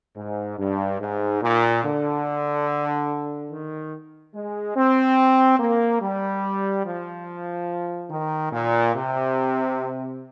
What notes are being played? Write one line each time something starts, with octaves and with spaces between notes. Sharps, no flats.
G#2
G2
G#2
A#2
D3
D#3
G#3
C4
A#3
G3
F3
D#3
A#2
C3